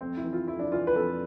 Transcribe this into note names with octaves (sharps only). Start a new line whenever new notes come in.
F2 C4
E4
E3
F4
F2 E4
D4
E3 F4
B4
F2 A4